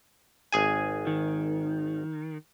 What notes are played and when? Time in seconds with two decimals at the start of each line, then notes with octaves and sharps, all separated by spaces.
0.53 G#1 G#4 G#5
1.07 D#3